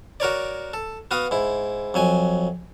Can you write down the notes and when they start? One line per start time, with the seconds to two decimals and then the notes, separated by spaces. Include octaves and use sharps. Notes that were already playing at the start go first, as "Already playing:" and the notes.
0.20 F#4 A#4 C#5 D5
0.74 A4
1.11 B3 F#4 F5 D#6
1.31 G#2 E4
1.94 F2 F#3 G#5